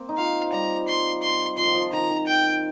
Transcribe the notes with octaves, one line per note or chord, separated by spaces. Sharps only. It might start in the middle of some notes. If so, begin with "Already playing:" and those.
Already playing: A#3 C4
D#4
F4 F5
G3 A#5
C6
C6
F3 C6
D#3
F3
D#3 A#5
D#3
G5